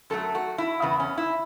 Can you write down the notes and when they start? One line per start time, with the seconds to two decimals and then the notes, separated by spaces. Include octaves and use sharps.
0.10 F#2 F#3 A3 A4
0.35 F#4
0.58 E4
0.82 E2 C#3 B3
1.00 C#4
1.18 E4